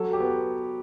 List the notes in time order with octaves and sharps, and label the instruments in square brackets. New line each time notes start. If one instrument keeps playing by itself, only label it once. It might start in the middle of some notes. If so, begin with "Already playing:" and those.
Already playing: [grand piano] F#3 A4
G4
B3